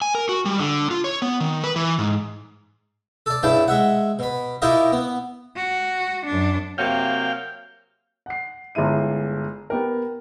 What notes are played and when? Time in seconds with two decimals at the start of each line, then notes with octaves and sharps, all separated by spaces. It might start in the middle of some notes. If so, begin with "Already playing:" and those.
0.02 G#5
0.15 A#4
0.29 F#4
0.45 G3
0.59 D3
0.91 F4
1.04 C#5
1.22 B3
1.40 D#3
1.64 B4
1.76 E3
1.98 G#2
3.26 A4 D5
3.43 G2 C#3 E4 G5 A5
3.68 G#3 E5 F#5
4.19 B2 B5
4.62 E4 F4 G4 A#4 D#5
4.92 B3
5.56 F#4
6.27 F#2 D4
6.78 C3 F#3 A#3 F5 G5
8.26 F#5 C7
8.75 G1 G2 G#3 E4 D#7
9.70 B3 G4 A#4